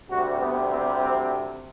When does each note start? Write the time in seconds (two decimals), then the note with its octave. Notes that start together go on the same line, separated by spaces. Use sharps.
0.10 D2 C3 G3 F#4
0.41 B3
0.71 C4
1.01 C4